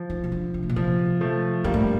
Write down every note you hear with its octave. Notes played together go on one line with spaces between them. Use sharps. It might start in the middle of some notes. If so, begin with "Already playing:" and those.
Already playing: F3
D#3
C3
D3
C3
A2
A#2
C3 F3
F3 A3
G2 G3 A#3
A2